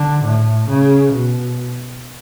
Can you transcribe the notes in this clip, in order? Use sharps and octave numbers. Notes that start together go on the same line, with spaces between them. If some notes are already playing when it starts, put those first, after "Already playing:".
Already playing: D3
A2
C#3
B2